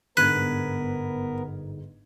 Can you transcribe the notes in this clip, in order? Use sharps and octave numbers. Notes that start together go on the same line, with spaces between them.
G1 G#2 B3 A#4 B4 F#6 G#6